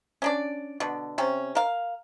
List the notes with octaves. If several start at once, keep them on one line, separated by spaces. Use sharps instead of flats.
C#4 D4 D5
B2 D3
C3 C#4
A#4 F5